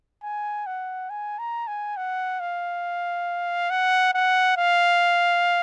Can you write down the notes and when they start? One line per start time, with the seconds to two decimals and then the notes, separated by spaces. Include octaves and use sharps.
0.23 G#5
0.66 F#5
1.10 G#5
1.39 A#5
1.67 G#5
1.97 F#5
2.40 F5
3.70 F#5
4.14 F#5
4.57 F5